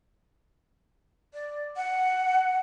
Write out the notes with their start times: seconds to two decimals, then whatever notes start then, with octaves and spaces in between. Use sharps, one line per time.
1.34 D5
1.76 F#5